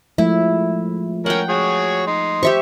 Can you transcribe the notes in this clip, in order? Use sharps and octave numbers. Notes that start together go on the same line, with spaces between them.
F3 G#3 A3 E4
C#4 A#4 F#5 G5
F#4 G#4 C#5
D#4 C6
G4 C5 E5 C#6